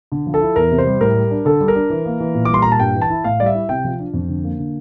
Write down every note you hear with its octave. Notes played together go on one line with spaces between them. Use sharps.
D3
F3
A4
E4
E2 A#4
C3
C5
G3
A2 A#4
G3
D4
D3 A4
G3
A#4
D4
E3
A#3
E3
A#2
D6
G3 C6
A#2 A#5
A5
G2 G5
E3
A5
E4
A2 F5
G3 D5
E5
E4
C3 G5
F3
D4
F2
D3
A#3
D3